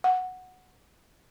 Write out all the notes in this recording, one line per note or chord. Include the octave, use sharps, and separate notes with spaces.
F#5